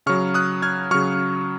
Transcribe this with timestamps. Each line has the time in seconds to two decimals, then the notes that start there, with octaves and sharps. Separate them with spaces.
0.06 C#3 F#3 C#6 F6
0.34 D#6 F#6
0.62 F6 G#6
0.91 C#3 F#3 C#6 F6